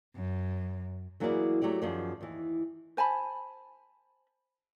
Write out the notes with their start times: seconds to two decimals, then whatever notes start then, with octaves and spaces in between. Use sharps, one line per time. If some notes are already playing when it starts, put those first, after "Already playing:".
0.15 F#2
1.20 E3 F#3 A#3 E4 G#4 D5
1.62 F#3 A3 G4 D5
1.82 F#2 D#3 F3 G#4 D5
2.21 D#2 E3
2.97 C5 G#5 A5 B5